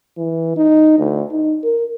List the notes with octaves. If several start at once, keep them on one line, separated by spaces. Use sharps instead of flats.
E3
D#4
D2
D#4
A#4